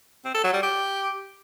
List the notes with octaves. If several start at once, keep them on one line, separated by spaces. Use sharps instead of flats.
C4
A4
F#3
G3
G4